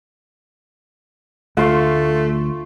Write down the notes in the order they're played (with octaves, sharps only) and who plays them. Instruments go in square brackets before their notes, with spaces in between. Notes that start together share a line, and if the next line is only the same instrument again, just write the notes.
[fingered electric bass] D2 [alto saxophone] A3 [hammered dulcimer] F4 C6 C#6